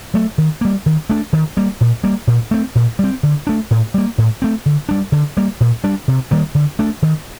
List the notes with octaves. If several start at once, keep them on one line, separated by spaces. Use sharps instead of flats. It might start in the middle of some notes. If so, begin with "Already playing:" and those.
F#3 A3
D#3
G3 A#3
D#3
A3 D4
D#3
G3 A#3
A#2
G3 A#3
A#2
A3 C4
A#2
G3 C4
D3
A3 D4
A2
G3 A#3
A2
A3 C4
D3
G3 D4
D3
G3 A#3
A#2
G3 D4
C3
D#3 G3 A#3
D3
A3 D4
D#3